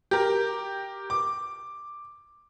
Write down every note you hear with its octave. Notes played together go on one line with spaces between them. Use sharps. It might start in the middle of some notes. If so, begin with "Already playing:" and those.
G4 A#4
D6